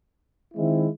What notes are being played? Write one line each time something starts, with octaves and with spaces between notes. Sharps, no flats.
D#3 G#3 C4 E4